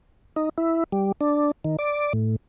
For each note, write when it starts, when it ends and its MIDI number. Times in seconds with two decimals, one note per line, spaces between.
0.36 0.49 63
0.58 0.84 64
0.92 1.12 55
1.21 1.51 62
1.65 1.77 51
1.79 2.13 74
2.13 2.36 45